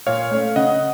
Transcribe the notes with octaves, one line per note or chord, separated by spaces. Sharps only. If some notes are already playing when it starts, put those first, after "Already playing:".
A#2 C#5 F5
A3 C#4
C#3 D#5 F#5